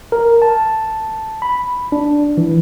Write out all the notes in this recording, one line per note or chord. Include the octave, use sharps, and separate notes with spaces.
A#4
A5
B5
D4
E3